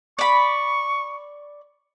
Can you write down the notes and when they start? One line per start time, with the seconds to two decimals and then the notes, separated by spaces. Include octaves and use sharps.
0.19 D5 B5 C#6